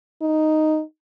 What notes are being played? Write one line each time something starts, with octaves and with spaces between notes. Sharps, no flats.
D#4